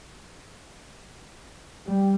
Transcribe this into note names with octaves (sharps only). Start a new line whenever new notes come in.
G3